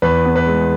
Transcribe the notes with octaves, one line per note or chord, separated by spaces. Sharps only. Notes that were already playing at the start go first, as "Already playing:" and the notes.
E2 B4
B3
B4
G#3